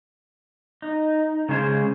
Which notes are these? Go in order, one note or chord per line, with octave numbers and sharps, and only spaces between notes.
D#4
C#3 G#3 C#4 G#4 C5